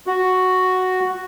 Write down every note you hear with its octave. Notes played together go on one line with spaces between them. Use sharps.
F#4